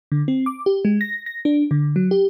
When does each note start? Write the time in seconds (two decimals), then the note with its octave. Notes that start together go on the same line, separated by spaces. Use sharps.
0.12 D3
0.28 C4
0.46 D6
0.66 G4
0.85 G#3
1.01 A#6
1.26 A#6
1.45 D4
1.71 D3
1.96 F#3
2.11 G4